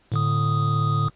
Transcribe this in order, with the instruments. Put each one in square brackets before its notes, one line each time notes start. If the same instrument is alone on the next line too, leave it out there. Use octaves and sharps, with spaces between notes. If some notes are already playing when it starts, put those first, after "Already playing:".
[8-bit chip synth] A2 D3 D#6